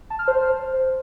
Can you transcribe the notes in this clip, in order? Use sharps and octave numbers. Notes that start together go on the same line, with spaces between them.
A5
F6
C5